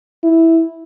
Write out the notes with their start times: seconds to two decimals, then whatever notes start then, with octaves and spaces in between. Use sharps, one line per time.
0.23 E4